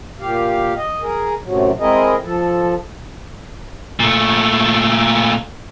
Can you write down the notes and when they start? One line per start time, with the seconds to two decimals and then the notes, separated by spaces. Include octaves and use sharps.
0.20 A#2 G4 F5
0.77 D#5
1.02 G#4 A#4
1.45 F#2 A2 C3 F#3
1.80 G#3 C4 E4 G#4 A#4 D#5
2.23 F3 A4
4.00 A#2 A3